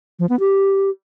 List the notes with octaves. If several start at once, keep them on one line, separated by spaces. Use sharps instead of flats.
F3
B3
G4